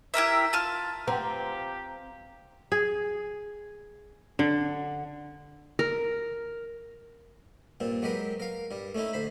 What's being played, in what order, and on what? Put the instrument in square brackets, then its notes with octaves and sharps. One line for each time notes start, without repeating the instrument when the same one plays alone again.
[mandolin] E4 G4 A#4 E5
F4 A5 F6
[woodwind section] F3 G4 [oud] C4 [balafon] B4 F#5 G5 [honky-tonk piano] A#5
[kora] G#4
D3
[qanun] A#4
[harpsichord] G2 A#2 C4
F#3 G#3 G4 A#4 B4
A#4 F5
G2 G3
A3 C#4 D#4 E4
D2 C5 B5